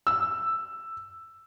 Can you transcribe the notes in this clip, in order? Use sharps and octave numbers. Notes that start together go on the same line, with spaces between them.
E6